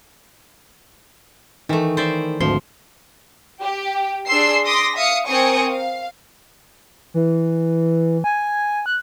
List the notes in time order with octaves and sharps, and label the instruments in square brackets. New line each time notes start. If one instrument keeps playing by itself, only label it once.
[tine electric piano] D#3 [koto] E3 A3
[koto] C5 D5 E5
[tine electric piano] G#1 D2 C6 [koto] F3
[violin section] G4
D4 G#4 C6 E6 C7
C6 D6 D#6 A#6 B6
E5 F5 D#6 C#7
C4 A#4 G#5 C#6 D#6 C#7
F5
[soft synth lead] E3
G#5
F#6